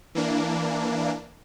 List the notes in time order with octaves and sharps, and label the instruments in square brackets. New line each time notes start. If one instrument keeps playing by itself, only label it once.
[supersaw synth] E3 A#3 D4